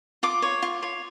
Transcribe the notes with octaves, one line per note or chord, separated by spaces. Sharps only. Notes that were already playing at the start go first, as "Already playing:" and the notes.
F4 D6
C#5
F4
C#5